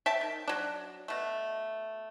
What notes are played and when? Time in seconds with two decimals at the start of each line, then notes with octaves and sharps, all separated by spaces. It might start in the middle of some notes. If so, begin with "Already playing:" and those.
0.06 E5 G5 A5
0.21 D#3
0.48 F#3 D4
1.08 B2 A3